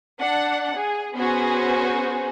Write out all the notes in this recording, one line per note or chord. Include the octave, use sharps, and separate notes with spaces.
D4 F#5
G#4
B3 C#4 F#4 G#4 C5